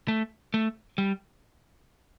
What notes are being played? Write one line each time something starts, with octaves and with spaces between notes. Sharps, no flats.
A3
A3
G3